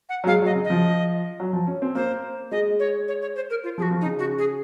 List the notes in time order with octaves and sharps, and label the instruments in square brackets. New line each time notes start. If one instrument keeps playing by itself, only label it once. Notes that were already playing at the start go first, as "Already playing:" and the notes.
[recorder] F#5
[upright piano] F#3
[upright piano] G#3 [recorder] F5
[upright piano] F#3 [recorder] D#5
[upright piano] C#3
[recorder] D#5
[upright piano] F3
F#3
F3
C#4
C4
[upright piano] A#3 [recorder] C5
[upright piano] G#3 [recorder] D#5
[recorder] C#5
C#5
C#5
C5
A#4
F4
[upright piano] F3 [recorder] G#4
[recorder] F#4
[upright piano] F3
[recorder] D#4
[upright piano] C#3
[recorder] F#4
G#4